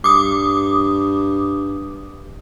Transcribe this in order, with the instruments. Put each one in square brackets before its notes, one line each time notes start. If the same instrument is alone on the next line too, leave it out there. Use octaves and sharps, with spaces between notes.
[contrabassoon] G2 [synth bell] D6 D#6